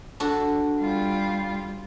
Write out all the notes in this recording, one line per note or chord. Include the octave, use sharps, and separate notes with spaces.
D4 F#4 A4
G3 F4